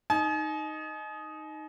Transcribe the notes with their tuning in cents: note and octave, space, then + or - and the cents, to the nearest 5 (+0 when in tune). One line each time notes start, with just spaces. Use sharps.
D#4 +0 G#5 +45